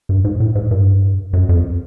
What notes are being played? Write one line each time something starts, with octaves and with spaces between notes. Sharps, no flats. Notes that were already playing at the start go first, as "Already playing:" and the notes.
G2
G#2
A2
G#2
G2
F#2
F2